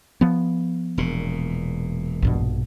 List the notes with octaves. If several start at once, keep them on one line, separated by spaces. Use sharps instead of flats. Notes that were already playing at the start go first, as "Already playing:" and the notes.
F3 B3
E1 A#2
A#1 G2 B2